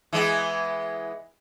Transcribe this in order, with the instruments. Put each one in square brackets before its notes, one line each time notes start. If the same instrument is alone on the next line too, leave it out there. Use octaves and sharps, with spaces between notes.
[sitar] E3 G#3 B3